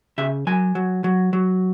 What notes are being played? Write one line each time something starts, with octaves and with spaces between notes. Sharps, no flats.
C#3 E5
F#3 G#5
F#3
F#3
F#3